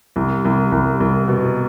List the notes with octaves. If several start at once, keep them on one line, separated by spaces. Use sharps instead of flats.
C2
C2
C2
C2
B2